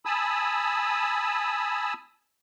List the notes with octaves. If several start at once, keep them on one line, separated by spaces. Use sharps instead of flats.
G#5 A5 B5 D#6 E6